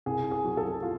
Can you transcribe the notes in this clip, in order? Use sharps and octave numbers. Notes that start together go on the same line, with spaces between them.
C2 G#4
G#4
F#3
A4
F4